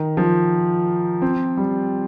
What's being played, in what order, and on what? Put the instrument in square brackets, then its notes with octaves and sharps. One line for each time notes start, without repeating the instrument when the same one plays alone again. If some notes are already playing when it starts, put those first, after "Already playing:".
Already playing: [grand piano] D#3
F3
C4
G3